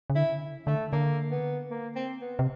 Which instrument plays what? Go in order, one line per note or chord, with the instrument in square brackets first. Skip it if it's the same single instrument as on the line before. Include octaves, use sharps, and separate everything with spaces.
[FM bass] C#3
[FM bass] D3 [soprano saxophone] E4
[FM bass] D3 [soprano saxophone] A3
[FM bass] D3 [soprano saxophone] A#3
[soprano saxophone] B3
A#3
C4
B3
[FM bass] C3